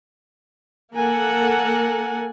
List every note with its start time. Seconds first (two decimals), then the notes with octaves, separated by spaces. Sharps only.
0.94 A#3 A4 A#4 F#5 G#5